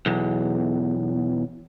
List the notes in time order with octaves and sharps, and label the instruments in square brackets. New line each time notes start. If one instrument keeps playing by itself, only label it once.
[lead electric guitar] B1 E2